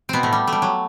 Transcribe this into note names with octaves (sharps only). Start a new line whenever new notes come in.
B2 B3 C4
A2 A3
G3
A3
G3
F#3